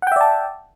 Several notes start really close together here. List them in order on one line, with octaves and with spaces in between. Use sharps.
F#5 G5 E5 D5 A5